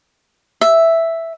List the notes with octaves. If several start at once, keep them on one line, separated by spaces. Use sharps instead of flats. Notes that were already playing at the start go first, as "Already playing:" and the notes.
E5